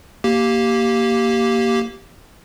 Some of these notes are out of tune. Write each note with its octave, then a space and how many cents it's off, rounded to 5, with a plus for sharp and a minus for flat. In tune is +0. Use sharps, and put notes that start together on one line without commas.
A#3 +0 G4 -10